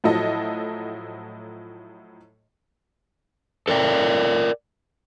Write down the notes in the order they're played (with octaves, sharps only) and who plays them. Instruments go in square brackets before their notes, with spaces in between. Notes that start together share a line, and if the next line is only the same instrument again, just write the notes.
[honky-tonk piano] A2 F3 F#3 E4 A4 D#5
[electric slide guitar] A4 A#4 D5 G5